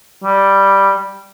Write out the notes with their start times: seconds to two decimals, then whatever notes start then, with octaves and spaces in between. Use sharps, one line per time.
0.24 G3